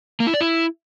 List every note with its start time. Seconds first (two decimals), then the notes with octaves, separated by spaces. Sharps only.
0.20 A#3
0.27 E4
0.34 D5
0.41 E4